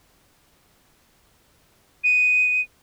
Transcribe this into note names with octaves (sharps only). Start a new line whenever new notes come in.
D#7